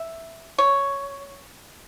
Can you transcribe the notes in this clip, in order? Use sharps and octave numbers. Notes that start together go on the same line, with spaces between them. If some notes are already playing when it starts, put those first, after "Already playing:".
Already playing: E5
C#5